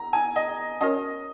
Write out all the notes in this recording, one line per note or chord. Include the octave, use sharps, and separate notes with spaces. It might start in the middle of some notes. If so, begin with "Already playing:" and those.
Already playing: A#5
G#5
D#5
C#4 F#4 A#4 C#5 D#5